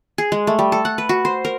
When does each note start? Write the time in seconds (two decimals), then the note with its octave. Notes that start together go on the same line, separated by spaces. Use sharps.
0.18 G#4
0.32 G#3
0.47 A3
0.59 G3
0.72 A4
0.85 F#5
0.98 B4
1.09 F#4
1.25 C5
1.45 A#4